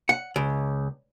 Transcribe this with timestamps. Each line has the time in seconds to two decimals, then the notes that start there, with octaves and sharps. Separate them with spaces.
0.09 F#5
0.36 C#2